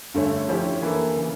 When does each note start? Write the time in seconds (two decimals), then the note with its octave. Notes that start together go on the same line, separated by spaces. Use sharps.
0.14 G2 D3 A3 C#4
0.48 D3 F3 C#4 E4 G4
0.82 E3 A#3 E4 A4
1.16 C#3 E3